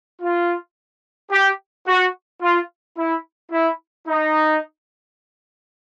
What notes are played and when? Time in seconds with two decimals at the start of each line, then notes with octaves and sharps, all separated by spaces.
0.21 F4
1.30 G4
1.86 F#4
2.41 F4
2.96 E4
3.51 E4
4.07 D#4